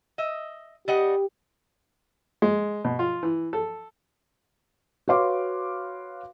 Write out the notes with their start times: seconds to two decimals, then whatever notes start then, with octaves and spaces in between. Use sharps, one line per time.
0.18 D#5 E5
0.88 G3 G4 D#5 F#5
2.42 G#3
2.85 B2
2.99 F4
3.23 E3
3.53 A4
5.08 F#4 B4 C#5 F5 C6 D6